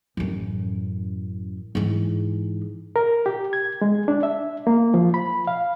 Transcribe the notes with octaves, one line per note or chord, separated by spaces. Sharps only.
A1 F#2
G#2 E3
A#4
G4
G#6
G#3
D4
E5
A#3
F3
B5
F5